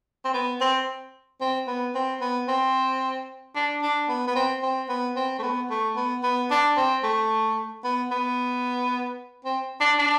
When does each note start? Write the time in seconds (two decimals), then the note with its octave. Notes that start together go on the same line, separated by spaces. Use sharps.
0.25 C4
0.34 B3
0.61 C4
1.41 C4
1.67 B3
1.95 C4
2.21 B3
2.48 C4
3.55 D4
3.82 D4
4.09 B3
4.27 B3
4.35 C4
4.63 C4
4.89 B3
5.16 C4
5.39 A3
5.42 B3
5.70 A3
5.96 B3
6.23 B3
6.50 D4
6.77 C4
7.03 A3
7.84 B3
8.11 B3
9.45 C4
9.80 D4
9.99 D4